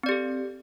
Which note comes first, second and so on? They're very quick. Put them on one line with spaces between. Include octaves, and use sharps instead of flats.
C4 D5 G4 A4